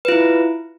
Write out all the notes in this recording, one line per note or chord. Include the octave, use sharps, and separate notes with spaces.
E4 F4 B4